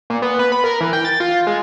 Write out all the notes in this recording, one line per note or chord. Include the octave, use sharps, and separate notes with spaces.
A#2
B3
B4
B5
A#4
E3
G5
A6
F4
G#3